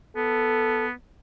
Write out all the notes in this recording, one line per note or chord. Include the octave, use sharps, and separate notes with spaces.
B3 A4